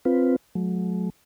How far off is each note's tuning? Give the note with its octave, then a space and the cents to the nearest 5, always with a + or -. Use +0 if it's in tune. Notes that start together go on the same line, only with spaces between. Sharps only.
C4 +0 F4 +0 B4 +0
F#3 -30 A3 -45